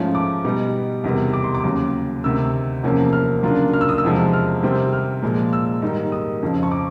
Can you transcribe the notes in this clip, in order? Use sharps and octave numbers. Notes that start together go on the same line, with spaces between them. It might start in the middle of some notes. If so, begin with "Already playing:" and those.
Already playing: G#2 F3 A3 C#4 F4
D6
B2 G3 B3 D#4
E2 C3 D#3 G3 B3
D6
C6
D6
D#2 C#3 F#3
D2 C3 D#3 E6
E2 C3 F3 A#3 C#4
F6
C#3 F#3 A#3 D4 F4
F6
E6
D#6
E6
E2 C3 F3 G#3
F6
C3 D#3 G3 C4
F6
A#2 F3 G#3
E6
G#2 D#3 G3 A#3 D#4
D#6
F2 C#3 F3
C#6
D6